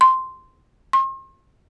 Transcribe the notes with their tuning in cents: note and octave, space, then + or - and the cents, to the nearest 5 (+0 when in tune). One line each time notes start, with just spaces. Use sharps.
C6 -5
C6 +40